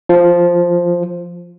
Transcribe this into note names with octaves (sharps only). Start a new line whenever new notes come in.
F3